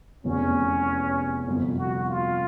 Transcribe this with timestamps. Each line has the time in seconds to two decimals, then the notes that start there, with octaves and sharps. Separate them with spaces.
0.24 F1 E2 C3 C#4
1.48 G1 F2 C3
1.78 F#4
2.08 F4